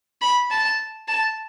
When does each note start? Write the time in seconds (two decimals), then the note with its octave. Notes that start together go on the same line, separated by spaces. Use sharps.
0.22 B5
0.51 A5
1.08 A5